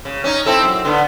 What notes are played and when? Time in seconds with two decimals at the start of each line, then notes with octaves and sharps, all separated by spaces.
0.05 C#3
0.24 C#4 D#4
0.46 C4 E4 A4
0.63 F#2
0.85 D3 B3